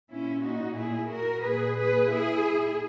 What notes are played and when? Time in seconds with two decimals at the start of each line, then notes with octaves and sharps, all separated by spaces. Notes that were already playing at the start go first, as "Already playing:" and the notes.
0.10 A#2 C#4 E4
0.44 D#4 F#4
0.77 E4 G#4
1.11 F#4 A#4
1.43 A#2 G#4 B4
1.77 G#4 B4
2.11 E4 G#4